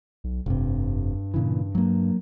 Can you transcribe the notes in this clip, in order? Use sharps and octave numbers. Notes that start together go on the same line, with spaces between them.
B1
F1 G2 C3
A#2 C#3 E3
F#3 A#3